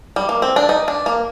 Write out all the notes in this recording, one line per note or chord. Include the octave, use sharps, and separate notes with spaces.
G3
A#3
C4
D4
D#4
D4
A#3